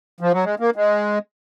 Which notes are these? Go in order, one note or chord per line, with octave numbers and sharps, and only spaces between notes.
F3
F#3
G#3
A#3
G#3